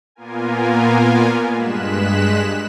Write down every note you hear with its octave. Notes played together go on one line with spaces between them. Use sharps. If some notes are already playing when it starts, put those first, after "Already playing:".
A#2 A#3 B3 F4 A#4 G#5
G2 G#3 F#6 B6 E7